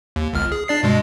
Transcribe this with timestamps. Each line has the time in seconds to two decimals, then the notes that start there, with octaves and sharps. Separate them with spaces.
0.16 D#2
0.33 G1 C#2 F6
0.52 G#4
0.68 D4 D5 C7
0.83 G2 B2 G#3